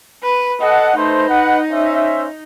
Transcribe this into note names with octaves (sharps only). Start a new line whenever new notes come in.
B4
A4 D#5 F#5
A3 D#4 B4 C5
B4 D#5 F#5
C#4 C5 E5